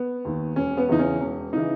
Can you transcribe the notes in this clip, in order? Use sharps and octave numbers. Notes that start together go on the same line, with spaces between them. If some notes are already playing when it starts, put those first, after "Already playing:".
Already playing: B3
D#2 D#3
E1 C#4
B3
E2 C#3 E3 D#4
C#4
E1
C#3 E3 D#4